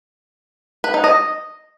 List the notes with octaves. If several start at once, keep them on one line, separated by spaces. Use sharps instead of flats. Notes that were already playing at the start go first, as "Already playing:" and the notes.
B4
D#4
D#5